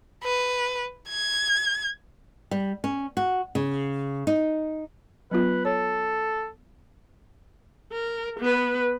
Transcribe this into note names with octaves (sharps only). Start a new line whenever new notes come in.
B4
G#6
G3
C#4
F#4
C#3
D#4
F#3 B3 F4 B4
A4 C#5
A#4
B3 B4